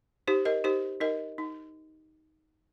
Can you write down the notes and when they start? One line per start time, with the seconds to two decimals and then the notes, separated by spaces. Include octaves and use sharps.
0.28 D#4 G4 C5
0.45 A#4 D#5
0.64 D#4 G4 C5
1.01 D#4 A#4 D#5
1.38 D#4